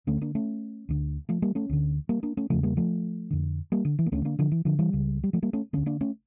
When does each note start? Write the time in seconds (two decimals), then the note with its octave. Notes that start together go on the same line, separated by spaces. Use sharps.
0.07 D2 D3 A3 C#4
0.22 A#3 D4
0.35 A3 C#4
0.89 D2 D3
1.29 F3 A3
1.42 G3 A#3
1.55 A3 C#4
1.69 D2 D3
2.09 G3 A#3
2.23 A#3 D4
2.37 A3 C#4
2.50 E2 C#3 F3 A3
2.63 G3 A#3
2.77 F3 A3
3.30 F2 D3
3.72 G3 A#3
3.85 D3
3.99 E3
4.06 A#3
4.12 D2 D3 A3 C#4
4.25 A#3 D4
4.39 D3 F3
4.52 E3
4.65 D3 F3
4.79 E3 G3
4.93 C#2 C#3
5.24 G3
5.33 F3 A3
5.42 G3 A#3
5.53 A3 C#4
5.73 D2 D3 A3 C#4
5.86 A#3 D4
6.01 A3 C#4